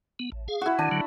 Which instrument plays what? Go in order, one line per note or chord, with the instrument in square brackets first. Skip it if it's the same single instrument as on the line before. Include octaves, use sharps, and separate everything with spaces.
[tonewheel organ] B3
A1
G#4 F5
[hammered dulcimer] E4 F#4
[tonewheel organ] D#3 [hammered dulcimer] D4
[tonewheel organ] D3 F#3